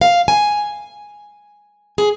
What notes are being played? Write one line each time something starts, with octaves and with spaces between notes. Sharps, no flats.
F5
G#5
G#4